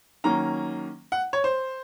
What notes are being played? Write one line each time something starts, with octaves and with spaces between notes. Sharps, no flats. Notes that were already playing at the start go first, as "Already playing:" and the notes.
D#3 F#3 A#3 C#4 A#5
F#5
C#5
C5